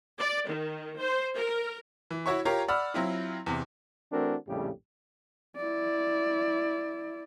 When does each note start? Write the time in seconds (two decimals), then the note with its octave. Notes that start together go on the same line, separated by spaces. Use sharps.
0.19 D5
0.48 D#3
0.99 C5
1.36 A#4
2.11 E3
2.26 E4 F#4 C#5 E5 C#6
2.45 F4 G4 A#4 C#5 F5 A#5
2.68 D5 F#5 B5 E6 F6
2.94 F#3 C4 E4 F4
3.46 E2 C3
4.12 E3 A3 C4 D4 F#4 A#4
4.48 A#1 F2 A2 C#3 G3 G4
5.57 E4 D5